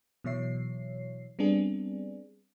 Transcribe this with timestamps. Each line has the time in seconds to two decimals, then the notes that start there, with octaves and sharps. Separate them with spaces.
0.24 B2 E3 F#3 C#5 E5 C7
1.39 G3 B3 C4 D4 G#4